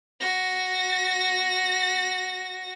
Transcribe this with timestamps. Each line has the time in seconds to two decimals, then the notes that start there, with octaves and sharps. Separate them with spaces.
0.20 F#4 A#6